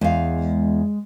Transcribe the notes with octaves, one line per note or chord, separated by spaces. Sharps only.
E2 G#3 F5